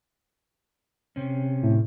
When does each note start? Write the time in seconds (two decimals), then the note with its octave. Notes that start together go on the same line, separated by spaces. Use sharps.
1.16 C3 C#4
1.63 A2